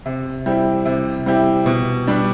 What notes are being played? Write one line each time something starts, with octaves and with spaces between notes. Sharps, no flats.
C3
G3 C4 E4 G4
C3
G3 C4 E4 G4
B2
G3 D4